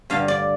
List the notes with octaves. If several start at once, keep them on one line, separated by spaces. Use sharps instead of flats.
G2 D3 F5
D5